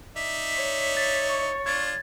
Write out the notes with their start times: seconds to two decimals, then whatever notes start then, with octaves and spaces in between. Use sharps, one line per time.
0.16 D#4 D5 E5 B6
0.55 C#5
0.97 A6
1.29 C#6
1.66 D4 F4 G#6 A6